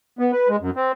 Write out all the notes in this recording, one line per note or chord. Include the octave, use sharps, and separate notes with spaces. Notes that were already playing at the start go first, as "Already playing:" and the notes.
B3
B4
G#3
F#2
C4